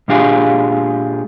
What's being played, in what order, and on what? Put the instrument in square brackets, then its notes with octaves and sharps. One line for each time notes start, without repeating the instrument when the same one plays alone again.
[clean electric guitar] A#2 G#3 D4 F4 G4 G#4